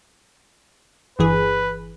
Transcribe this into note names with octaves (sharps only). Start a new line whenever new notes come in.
G1 E3 G#4 B4